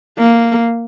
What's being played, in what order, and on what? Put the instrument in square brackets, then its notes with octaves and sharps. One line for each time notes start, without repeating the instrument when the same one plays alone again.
[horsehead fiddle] A#3